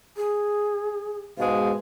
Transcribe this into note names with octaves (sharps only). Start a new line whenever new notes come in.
G#4
G#2 B2 G#3 F5